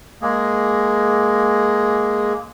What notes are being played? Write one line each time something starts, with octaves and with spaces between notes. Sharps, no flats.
G#3 A#3 G#4